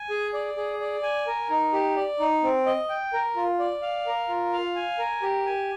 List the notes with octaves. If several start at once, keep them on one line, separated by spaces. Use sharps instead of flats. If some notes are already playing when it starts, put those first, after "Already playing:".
Already playing: G#5
G#4
D5
G#4
D5
G#5
A#4
D#4
G4
D5
D#4
C4
D#5
G5
A#4
F4
D5
F5
A#4
F4
F5
G#5
A#4
G4
G#5